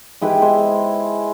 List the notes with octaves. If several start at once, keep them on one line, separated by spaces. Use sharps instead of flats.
G#3 E4 G4 B4
G#3 C5